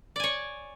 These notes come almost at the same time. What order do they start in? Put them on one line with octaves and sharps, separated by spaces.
D5 G#5 C#5